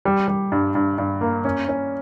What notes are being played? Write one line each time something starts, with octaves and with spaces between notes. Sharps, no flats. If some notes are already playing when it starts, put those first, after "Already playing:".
G3
G3
G2
G2
G2
A#3
C#4
C#4